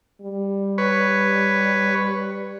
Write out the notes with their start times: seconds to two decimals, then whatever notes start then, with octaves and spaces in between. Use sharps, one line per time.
0.22 G3
0.78 B4 C#5